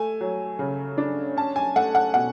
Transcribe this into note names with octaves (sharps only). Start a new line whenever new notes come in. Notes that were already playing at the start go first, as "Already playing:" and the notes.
Already playing: A3 G#5
F#3
C#3
D4
C#4 A5
G#5
A3 F#5
F#5
B2 F#5